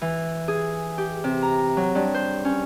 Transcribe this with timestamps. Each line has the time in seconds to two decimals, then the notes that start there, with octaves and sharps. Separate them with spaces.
0.01 E3
0.48 G#4
0.98 G4
1.24 C3
1.42 A#5
1.77 F#3
1.95 G2
2.14 C5
2.45 C#4